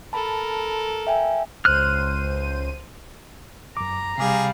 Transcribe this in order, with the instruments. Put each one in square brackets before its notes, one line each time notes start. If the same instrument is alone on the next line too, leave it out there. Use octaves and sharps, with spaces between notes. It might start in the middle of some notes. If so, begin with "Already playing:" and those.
[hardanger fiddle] A4 A#4 [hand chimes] A5 B5
[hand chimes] E5 G5 G#5
[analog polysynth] C#2 C5 D#7 [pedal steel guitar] F6 F#6
[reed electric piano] F#2 D6 [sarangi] A#5
[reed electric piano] C3 D6 [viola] G3 F5 [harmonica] G#4